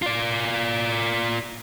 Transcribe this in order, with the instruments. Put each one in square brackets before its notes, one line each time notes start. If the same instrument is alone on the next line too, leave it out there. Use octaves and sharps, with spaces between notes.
[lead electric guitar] F4 D5